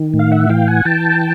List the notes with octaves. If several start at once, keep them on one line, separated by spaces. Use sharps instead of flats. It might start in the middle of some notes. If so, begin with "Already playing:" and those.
Already playing: D#3
A2
F5
E5 F#5
E3 F5 G5
F#5 G#5
E3 G5 A5